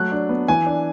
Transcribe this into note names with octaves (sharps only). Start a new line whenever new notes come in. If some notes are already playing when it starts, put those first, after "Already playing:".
Already playing: F#3 A3 F#6
D4
B3
E3 G#5
D4